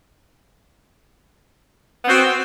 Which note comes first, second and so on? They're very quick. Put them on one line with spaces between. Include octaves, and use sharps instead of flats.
B3 C4 F#4